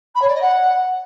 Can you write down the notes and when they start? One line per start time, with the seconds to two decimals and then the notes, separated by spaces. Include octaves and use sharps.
0.15 B5
0.21 C#5
0.28 D5
0.35 D#5
0.41 F#5